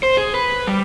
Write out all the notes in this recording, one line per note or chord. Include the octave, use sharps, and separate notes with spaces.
C5
G#4
B4
G3